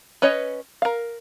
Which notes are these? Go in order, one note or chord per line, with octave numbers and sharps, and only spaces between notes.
C#4 B4 C#5 D#5
A#4 F5